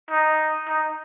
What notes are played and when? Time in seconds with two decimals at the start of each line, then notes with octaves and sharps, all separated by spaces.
0.10 D#4
0.68 D#4